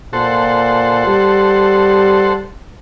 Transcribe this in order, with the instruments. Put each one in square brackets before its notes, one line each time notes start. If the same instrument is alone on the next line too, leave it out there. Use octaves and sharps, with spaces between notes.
[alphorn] A#2 [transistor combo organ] A4 C5 F#5
[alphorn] G3